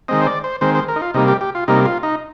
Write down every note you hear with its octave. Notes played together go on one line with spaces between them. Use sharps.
D#3 G#3 C4 D#5
C5
D5
C5
D#3 G#3 C4 C5
C5
A#4
D#4
F4
C3 G3 A#3 D#4
G4
G4
F4
C3 G3 A#3 D#4
F4
D#4